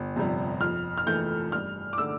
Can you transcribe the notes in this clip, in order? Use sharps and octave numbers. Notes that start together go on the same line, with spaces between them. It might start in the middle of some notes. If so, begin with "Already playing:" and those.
Already playing: G1
F2 C3 G3
F2 F6
F6
E3 A3 G6
G2 F6
D6
D3 A3 D4 E6